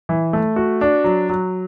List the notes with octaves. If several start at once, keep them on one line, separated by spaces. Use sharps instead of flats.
E3
A3
F#4
D4
F#3
F#3